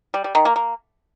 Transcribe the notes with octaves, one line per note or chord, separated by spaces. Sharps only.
G3
G3
D#3
A#3
A#3